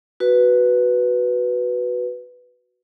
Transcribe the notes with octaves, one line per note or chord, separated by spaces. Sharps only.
F#4 B4